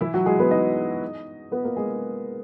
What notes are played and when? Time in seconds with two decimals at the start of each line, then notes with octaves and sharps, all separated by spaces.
0.01 E3 E4
0.14 F#3 F#4
0.26 G#3 G#4
0.39 B3 B4
0.51 D#4 D#5
1.52 B3 B4
1.64 A#3 A#4
1.76 G#3 G#4